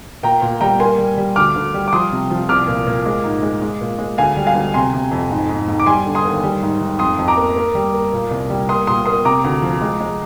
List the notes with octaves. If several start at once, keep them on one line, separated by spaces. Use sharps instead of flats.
A#2 G5 A#5
A#2
G3 G5 A#5
A#3 G#5 C6
G3
G3
D2 D6 F6
D2
G3
D6
F3 C6 D#6
C3
F3
C2 D6 F6
A#2
A#2
G#3
G#2
G#3
G#3
A#2
G#3
D2 F5 G#5
G3
F5 G#5
D2
C3 G#5 C6
C3
F2
G#2
G#2
G#2
D6
G3 G#5 C6
D3
C6 D#6
D#2
G3
G#2
G#2
F2 C6 D#6
F2
A#5 D6
A#3
A#3
G3
A#3
A#2
C2
G3
A#3 C6 D#6
A#2 C6 D#6
A#3 C6 D#6
C3 A#5 D6
D2
F3
G#3
G#3